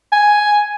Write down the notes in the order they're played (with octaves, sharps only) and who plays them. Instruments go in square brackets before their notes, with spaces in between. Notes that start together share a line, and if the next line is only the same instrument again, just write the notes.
[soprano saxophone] G#5